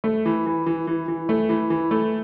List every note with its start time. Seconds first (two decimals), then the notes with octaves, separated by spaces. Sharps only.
0.04 A3
0.25 E3
0.46 E3
0.66 E3
0.87 E3
1.08 E3
1.29 A3
1.49 E3
1.70 E3
1.91 A3